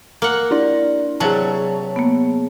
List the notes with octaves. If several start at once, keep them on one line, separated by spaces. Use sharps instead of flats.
A#3 F#5
D4 E4 D5
C3 F#3 G#4 C#5 A5
A#3 B3